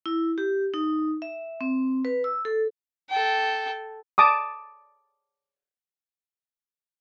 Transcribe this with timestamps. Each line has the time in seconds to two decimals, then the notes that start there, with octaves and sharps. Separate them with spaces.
0.06 E4
0.38 G4
0.74 D#4
1.22 E5
1.61 C4
2.05 B4
2.24 E6
2.45 A4
3.09 A4 G5
4.18 A5 D6 D#6